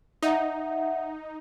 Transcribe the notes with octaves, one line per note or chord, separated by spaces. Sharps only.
D#4 E5 F#5